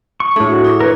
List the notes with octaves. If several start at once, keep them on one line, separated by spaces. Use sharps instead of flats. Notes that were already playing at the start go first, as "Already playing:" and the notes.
C#6
A2 A3 D4 G#4 D#6
F#4
E4 G#4 D6
A#4 B4 C#5